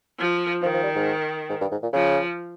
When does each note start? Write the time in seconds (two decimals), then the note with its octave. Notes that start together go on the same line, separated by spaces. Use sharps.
0.18 F3
0.62 D#3 F3
0.74 F3
0.84 G3
0.95 G#2
1.49 G#2
1.61 G2
1.72 G#2
1.83 A#2
1.93 C#3 F3